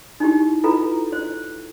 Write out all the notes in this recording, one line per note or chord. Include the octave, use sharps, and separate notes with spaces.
D#4 E4 G4
E4 F4 A4 B4 A#5
C5